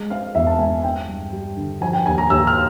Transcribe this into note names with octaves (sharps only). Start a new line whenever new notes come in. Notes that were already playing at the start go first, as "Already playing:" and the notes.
Already playing: G#3
C4 F5
E2 E5
A5
G#3 G#5
C4 G5
G2
G3
D3
F3 G#5
G5
D#2 G#5
A#5
D#2 E6
F6